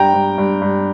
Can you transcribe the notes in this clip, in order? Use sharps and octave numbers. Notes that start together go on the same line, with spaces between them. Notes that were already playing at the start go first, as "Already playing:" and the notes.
Already playing: G2 G5 A#5
G2
G2
G2